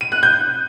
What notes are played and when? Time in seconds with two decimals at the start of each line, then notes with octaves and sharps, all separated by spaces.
0.01 D#7
0.12 F#6
0.23 G6